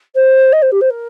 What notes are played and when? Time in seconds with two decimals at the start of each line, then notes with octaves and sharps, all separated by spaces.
0.15 C5
0.52 D#5
0.62 C5
0.71 G4
0.81 C5
0.90 A#4